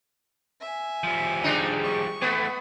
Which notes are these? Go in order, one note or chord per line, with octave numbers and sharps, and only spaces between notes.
E5 G#5
F3 G3
G#3 D4 D#4
C#6
E3 A3 B3